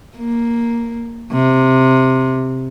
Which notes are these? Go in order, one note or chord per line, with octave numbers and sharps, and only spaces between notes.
A#3
C3